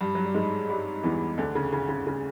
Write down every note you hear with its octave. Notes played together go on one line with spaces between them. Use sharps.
G2 G3
F#3
G3
G#2 G#3
G2 G3
E2 E3
D2 D3
C#3
C#3
C#3
C#3